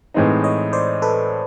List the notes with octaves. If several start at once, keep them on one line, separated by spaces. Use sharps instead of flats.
A2 E3 G#3 C4 D#4
C#5 D#5
C5 D5
A4 B4